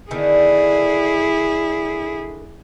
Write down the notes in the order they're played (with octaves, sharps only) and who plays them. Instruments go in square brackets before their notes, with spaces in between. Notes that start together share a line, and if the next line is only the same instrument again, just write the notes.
[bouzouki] D3 D#3 B3 [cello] E4 G#4